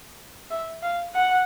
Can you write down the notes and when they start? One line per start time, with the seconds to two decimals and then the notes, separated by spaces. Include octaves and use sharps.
0.50 E5
0.83 F5
1.15 F#5